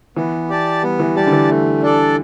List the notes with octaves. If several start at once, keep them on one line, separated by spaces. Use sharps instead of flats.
E3 B3
G4 D5 A5
G3 B3
E3
G3 G4 D5 A5
D3
E3
A3
D4 A4 D5